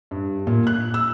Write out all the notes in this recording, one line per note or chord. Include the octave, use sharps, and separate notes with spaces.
G2
A#2
F#6
E6